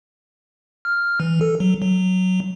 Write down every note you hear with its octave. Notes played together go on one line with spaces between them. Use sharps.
F6
E3
A4
F#3
F#3